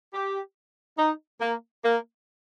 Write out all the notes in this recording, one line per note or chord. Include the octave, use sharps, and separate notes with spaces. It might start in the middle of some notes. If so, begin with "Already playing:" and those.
G4
D#4
A#3
A#3